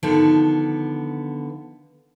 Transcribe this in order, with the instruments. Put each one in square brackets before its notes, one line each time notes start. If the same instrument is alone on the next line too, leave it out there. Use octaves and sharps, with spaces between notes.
[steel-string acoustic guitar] D3 D#3 F3 B3